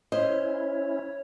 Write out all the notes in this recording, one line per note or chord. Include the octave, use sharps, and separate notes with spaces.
C#4 E4 C5 C#5 D#5